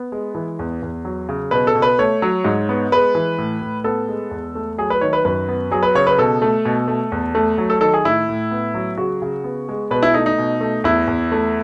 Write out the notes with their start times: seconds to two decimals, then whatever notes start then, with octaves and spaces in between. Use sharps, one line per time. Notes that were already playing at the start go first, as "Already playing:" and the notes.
Already playing: B3
0.12 G#3
0.35 E3
0.59 E2
0.82 E2
1.05 F#3
1.29 C#3
1.51 B2 B4
1.67 A4
1.75 B2
1.82 B4
1.99 A3 C#5
2.22 F#3
2.44 G#2
2.69 B3
2.92 G#3 B4
3.15 E3
3.38 A2
3.61 A2
3.84 B3 A4
4.08 G#3
4.31 E2
4.55 A3
4.78 F#3 G#4
4.90 B4
5.01 D#3 C#5
5.13 B4
5.25 F#2 B4
5.49 B3
5.71 F#3 G#4
5.83 B4
5.95 C#3 C#5
6.07 B4
6.18 B2 A4
6.42 A3
6.65 B2
6.88 A3
7.12 E2
7.35 A3
7.58 F#3
7.70 A4
7.81 D#3 A4
7.94 G#4
8.04 A2 E4
8.29 A2
8.51 B3
8.74 F#3
8.98 C#3 F#4
9.22 C#3
9.44 B3
9.69 G#3
9.91 B2 B4
10.03 E4
10.14 A3 D#4
10.26 D#4
10.38 B2
10.61 A3
10.84 E2 E4
11.07 E2
11.32 A3